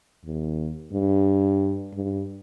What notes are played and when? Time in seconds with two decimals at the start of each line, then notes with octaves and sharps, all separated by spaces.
0.25 D#2
0.92 G2
1.94 G2